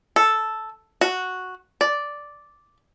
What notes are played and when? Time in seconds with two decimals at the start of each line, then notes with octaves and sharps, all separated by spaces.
0.16 A4
1.01 F#4
1.81 D5